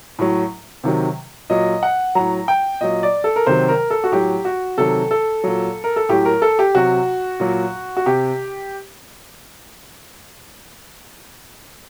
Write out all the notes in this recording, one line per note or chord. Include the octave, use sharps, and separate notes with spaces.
A2 F#3
C3 D#3 F#3
A#2 F#3 D#5
F#5
A2 F#3 A#5
G5
A#2 F#3 D#5
D5
A4
A#4
C3 D#3 F#3 C5
A#4
A4
F#4
A2 F#3 G4
F#4
C3 D#3 F#3 A4
A4
A#2 F#3
A#4
A4
A2 F#3 G4
A#4
A4
G4
C3 F#3 F#4
A#2 F#3
F#4
C3 G4